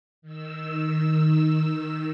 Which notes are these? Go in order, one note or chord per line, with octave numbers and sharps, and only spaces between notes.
D#3 E6